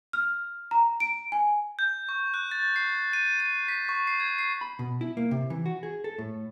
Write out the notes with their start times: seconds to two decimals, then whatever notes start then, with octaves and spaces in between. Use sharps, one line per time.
0.13 F6
0.71 A#5
1.00 D7
1.32 G#5
1.79 G6
2.09 C#6
2.34 F#6
2.51 A6
2.76 C7
3.13 D#7
3.40 D#7
3.68 B6
3.89 C#6
4.07 C7
4.20 G#6
4.39 C7
4.61 B5
4.79 B2
5.01 E4
5.17 A#3
5.31 C3
5.50 E3
5.66 F#4
5.83 G#4
6.04 A4
6.18 A2